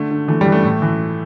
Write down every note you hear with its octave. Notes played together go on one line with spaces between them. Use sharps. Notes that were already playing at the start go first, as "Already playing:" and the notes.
Already playing: D3 A3
D3
E3 A3
G3
E3
A3
A2
E3